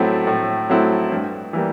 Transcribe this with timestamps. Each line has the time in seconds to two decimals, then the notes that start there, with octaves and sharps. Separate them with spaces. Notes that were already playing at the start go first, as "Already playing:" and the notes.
Already playing: A2 F#3 A3 C4 E4
0.27 A2
0.69 F#3 A3 C4 E4
1.12 G2
1.53 E3 G3 A#3